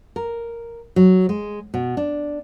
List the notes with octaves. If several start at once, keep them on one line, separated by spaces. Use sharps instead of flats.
A#4
F#3
G#3
B2
D4